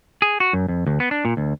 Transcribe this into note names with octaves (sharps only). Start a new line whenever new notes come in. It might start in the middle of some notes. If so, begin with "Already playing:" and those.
G#4
F#4
F#2
F2
D2
B3
D4
A#2
D2